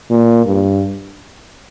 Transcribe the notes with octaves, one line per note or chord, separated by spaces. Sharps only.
A#2
G2